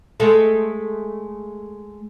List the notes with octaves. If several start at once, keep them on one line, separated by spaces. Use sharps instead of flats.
G#3 A3 A4